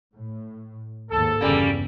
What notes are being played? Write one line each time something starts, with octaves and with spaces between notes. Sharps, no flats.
A2
D#2 G#2 A4
G1 E2 C#3 G3 A#3 C#4